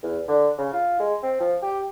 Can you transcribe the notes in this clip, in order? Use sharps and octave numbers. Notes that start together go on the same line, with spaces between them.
E2
D3
C#3
F4
G#3
C4
F3
G4